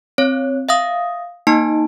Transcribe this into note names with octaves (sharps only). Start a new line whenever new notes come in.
C4 C#5
E5 F5 D#6
A#3 D#4 A5